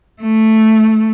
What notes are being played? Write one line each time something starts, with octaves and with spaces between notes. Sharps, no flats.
A3